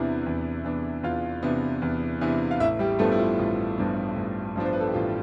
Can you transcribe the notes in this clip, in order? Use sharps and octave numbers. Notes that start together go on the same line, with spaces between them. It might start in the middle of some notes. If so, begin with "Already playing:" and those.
Already playing: E2 C3 E3 B3 D4 E4
E2
C3 E3 B3 D4
E2 F4 F5
C3 E3 B3 D4
E2
C3 E3 B3 D4
F5
A1 E4 E5
G3 G4
G2 F3 A3 B3 D4 A4
E4
F4
A1 F4
G2 F3 B3 D4
A1
G2 F3 B3 D4
C5
B4
A4
G4
A1 F4